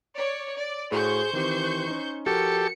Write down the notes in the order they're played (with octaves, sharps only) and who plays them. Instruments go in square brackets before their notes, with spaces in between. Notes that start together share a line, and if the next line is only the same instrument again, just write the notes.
[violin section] C#5 D5
D5
[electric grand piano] A2 F#4 [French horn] G#4 [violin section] C5 C#6 G6
[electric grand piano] D#3 C4 G4 [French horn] E3
[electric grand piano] C#4 D#4
[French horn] F3 [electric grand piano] F#4 A#4 [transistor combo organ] G4 A4 [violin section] C#7